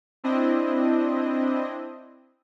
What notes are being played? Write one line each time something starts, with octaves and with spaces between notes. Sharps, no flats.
C4 D4 E4 D#5